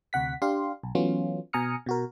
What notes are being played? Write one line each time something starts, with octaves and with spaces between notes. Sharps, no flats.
D2 C3 F#5 B6
D4 G4 F5 C6
B1
E3 F#3 A3 B3 C#4 F4
B2 G#5 A#5 D#6 F6 C#7
B2 F#4 A#4